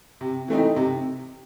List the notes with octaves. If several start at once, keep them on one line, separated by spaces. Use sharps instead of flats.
C3
E3 A3 C4 D#4
C3